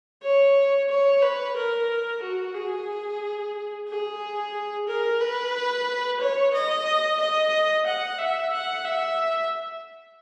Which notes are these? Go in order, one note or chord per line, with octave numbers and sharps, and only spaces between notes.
C#5
C#5
B4
A#4
F#4
G#4
G#4
A#4
B4
C#5
D#5
D#5
F#5
E5
F#5
E5